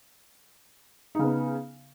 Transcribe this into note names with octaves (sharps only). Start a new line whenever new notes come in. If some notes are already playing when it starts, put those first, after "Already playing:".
C#3 B3 D#4